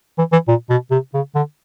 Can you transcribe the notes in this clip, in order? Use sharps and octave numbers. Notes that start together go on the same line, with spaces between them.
E3
E3
A#2
B2
C3
C#3
D3